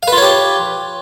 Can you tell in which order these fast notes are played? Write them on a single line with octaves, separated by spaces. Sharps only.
F5 B4 F4 C#5 G4